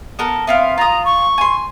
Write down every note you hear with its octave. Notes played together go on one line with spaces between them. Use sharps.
B3 A4 A#4
B3 C4 E5 F5
F4 A#5 D#6
C#6
G#5 C6